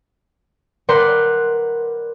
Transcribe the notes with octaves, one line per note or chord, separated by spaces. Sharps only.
A#4 B4 D5 F#5 C6 G6